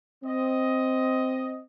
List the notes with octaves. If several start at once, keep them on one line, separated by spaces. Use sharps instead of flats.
C4 D#5